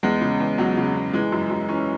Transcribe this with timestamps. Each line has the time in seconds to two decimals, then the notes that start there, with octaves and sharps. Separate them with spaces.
0.03 E2 G#3
0.21 C#3
0.40 E2
0.58 E2 F#3
0.77 C#3
0.95 E2
1.13 E3 G#3
1.32 F#2
1.50 F#2
1.69 E3 C#4